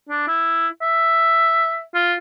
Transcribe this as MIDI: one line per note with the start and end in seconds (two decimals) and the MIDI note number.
0.09 0.25 62
0.28 0.68 64
0.82 1.83 76
1.94 2.15 65